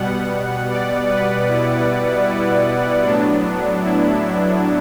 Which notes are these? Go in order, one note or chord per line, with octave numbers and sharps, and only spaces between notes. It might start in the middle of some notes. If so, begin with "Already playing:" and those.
Already playing: B2 G3 B3 F#5
D5
B4
E4
E4
A2 F#3 B3 D4
E4